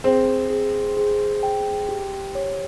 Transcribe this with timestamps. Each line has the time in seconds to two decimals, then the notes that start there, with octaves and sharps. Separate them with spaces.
0.04 C4 G#4
0.50 G#4
0.97 G#4
1.43 G5
1.89 G4
2.35 C#5